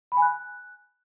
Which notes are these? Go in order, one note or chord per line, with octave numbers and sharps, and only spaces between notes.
B5
G#5
F#6